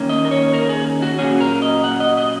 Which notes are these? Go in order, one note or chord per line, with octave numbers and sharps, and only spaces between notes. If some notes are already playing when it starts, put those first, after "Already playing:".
Already playing: D#3 A#3 C#4
D#5
A#4
C#5
A#4
G#4
F#4
A#2 F#3 C#4 G#4
A#4
D#5
F#5
D#5
D#5